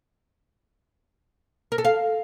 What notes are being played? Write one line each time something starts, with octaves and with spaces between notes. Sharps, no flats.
A#4
A4
F5